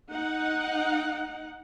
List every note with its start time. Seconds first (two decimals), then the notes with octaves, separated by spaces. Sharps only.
0.11 D#4 F#5